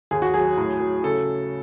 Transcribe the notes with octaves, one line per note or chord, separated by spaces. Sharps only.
D#2 G#4
F#4
F#3 G#4
A2
F#3
C#3 A4